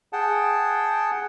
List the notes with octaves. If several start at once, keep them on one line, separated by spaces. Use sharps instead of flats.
G#4 F#5 G5 A5